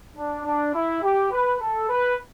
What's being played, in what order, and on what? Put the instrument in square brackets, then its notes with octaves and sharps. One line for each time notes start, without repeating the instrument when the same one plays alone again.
[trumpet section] D4
D4
E4
G4
B4
A4
B4